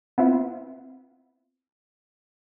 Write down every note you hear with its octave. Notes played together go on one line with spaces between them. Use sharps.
B3 C4 E4 F4